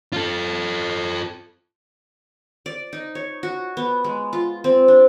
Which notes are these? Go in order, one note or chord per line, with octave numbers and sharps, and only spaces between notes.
F4 A4
D5
D#4
C#5
F#4
B3
G#3
F4
C4
D4